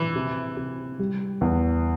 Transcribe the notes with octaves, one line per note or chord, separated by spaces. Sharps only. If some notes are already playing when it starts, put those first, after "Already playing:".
Already playing: E3
C3
C3
G3
E2